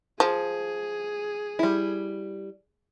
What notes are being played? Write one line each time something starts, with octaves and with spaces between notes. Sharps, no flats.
F3 G#4
G3 E4